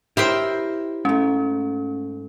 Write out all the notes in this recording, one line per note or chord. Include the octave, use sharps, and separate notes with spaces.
E4 G4 A#4 C5 D#5 G5 B5
G#2 A3 C#4